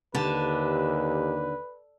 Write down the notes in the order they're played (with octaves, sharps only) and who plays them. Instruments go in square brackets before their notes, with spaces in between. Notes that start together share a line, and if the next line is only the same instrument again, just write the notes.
[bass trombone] D#2 [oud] D3 [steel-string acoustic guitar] G4 A5 [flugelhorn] B4